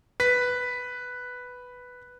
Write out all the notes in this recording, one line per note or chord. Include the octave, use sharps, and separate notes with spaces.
B4 B6